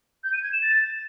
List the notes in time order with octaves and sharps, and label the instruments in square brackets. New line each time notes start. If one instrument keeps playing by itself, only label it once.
[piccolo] G6
D#7
G#6
E7
A6